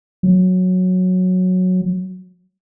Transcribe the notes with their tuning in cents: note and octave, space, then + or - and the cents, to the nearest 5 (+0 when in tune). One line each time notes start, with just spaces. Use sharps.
F#3 -10